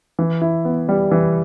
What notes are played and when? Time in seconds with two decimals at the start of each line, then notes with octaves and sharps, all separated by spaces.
0.19 E3
0.41 E4
0.65 B3
0.89 G3
1.12 E3